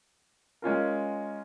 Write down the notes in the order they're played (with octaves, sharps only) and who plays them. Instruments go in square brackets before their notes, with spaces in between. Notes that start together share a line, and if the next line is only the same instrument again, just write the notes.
[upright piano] G#3 C#4 F4 A#4